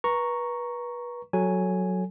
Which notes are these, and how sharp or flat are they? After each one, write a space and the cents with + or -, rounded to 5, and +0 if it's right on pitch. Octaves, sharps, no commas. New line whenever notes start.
B4 -30 A#5 +0 C#6 +0
F#3 +0 A4 +0 G#5 +0